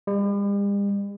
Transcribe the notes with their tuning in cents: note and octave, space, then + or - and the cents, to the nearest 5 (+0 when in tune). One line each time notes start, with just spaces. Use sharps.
G3 +45